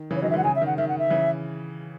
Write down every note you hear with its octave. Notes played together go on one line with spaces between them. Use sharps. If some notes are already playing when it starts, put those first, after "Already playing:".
Already playing: D#3
C#3 E3
C#5
D#3 F#3 D#5
E5
E3 G#3 F#5
C#3 G#5
E5
D#3 F#5
D#3 E5
F#5
E5
C#3 E3